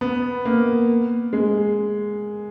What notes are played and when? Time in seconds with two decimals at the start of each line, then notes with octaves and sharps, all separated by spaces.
0.01 B3
0.45 A#3
1.33 G#3